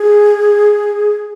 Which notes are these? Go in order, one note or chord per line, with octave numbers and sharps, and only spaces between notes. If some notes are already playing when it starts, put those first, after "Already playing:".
Already playing: G#4